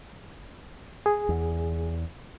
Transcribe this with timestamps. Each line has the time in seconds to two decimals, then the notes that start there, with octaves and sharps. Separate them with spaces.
1.06 G#4
1.29 E2